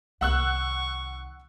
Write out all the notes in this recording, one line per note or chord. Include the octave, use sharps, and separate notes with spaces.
C2 D#3 F#5 C#6 E6 F#6